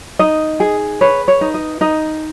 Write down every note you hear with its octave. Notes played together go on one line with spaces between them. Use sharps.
D#4 D#5
G#4
B4 C#5
C#5
D#4
D#5
D#4 D#5